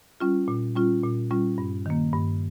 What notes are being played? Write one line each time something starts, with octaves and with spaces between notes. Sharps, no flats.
G3 C#4 F4
A#2
G3 C#4 F4
A#2
G3 C#4 F4
G2
D#3 A#3
G2